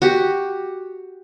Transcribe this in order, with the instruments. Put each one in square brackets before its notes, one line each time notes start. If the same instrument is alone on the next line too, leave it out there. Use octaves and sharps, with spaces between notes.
[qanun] F#4 G4